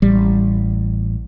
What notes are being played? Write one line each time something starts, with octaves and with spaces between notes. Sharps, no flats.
A1 G3